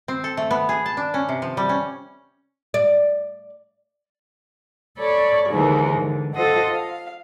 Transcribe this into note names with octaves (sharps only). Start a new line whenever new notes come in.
C4
A4
A3
B3
G#4
A5
D4
C#4
C3
F3
G3
C#4
D5
A4 C#5 D5 B5 C#6
D#2 G#2 D3 E3 A#4
D3
F4 A4 C5 D#5 F#5
F5